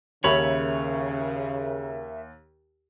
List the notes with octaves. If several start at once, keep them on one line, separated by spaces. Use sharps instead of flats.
D#2 C#3 A#4 C#5 E5 B5